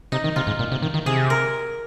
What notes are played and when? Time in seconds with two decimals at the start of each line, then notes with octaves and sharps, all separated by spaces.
0.12 C3 D#4
0.24 D#3
0.36 C3 F4
0.47 G#2
0.59 A#2
0.72 C3
0.82 D#3
0.94 D#3
1.06 C3 G#4
1.30 A#4